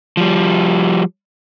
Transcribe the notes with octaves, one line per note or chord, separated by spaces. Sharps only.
F3 G3